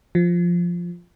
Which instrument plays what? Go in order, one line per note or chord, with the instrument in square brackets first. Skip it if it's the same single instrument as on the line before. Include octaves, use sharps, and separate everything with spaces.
[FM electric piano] F3